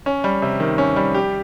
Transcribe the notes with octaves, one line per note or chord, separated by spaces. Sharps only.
C#4
G3
C3
D#3
C#4
G3
G4